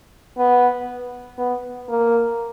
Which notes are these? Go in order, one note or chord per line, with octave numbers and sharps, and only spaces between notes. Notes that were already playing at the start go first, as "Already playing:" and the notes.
B3
B3
A#3